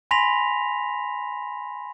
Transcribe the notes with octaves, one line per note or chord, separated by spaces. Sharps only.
G#5 B5 C6 A#6 B6 F7